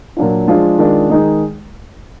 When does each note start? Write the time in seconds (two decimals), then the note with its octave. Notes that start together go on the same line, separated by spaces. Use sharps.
0.17 A#2 F#3 D4 F4
0.48 F3 G#3 D4 F4
0.78 D#3 G#3 D4 F4
1.09 D#3 G#3 D#4